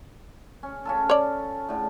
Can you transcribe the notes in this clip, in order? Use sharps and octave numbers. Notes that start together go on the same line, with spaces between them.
C#4
C#4 F4 A4
C#5 D5
A2 D3